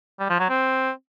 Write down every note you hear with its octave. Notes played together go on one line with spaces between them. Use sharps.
G3
F3
F#3
C4